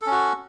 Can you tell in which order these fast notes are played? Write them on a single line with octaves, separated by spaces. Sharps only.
A4 C#4 F#4